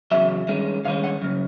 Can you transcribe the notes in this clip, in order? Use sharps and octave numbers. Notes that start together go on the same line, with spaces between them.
E2 C#3 F#3 E5
G2 D#3 G#3 C#4
G2 D#3 G#3 C#4 F5
F#5
F#2 C#3